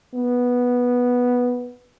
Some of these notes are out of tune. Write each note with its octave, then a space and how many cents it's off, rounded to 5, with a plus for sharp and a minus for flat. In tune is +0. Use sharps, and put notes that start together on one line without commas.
B3 -5